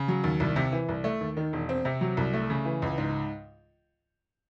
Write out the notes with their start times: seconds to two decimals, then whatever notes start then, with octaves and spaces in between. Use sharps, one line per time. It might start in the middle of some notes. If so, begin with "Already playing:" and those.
Already playing: C#3
0.08 F#3
0.24 D#2
0.40 C2
0.56 C3
0.72 E3
0.89 C2
1.04 A3
1.20 D#2
1.37 D#3
1.53 E1
1.69 C4
1.85 C3
2.01 F#3
2.17 C2
2.33 A3
2.50 C#3
2.65 E3
2.82 C#2
2.98 G#2